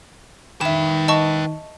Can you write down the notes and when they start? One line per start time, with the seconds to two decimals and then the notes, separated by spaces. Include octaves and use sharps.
0.61 D#3 B4 E5 G5 E7
1.08 D#5 A5 C#6